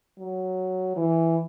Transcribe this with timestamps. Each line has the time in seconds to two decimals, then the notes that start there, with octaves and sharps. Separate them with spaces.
0.19 F#3
0.97 E3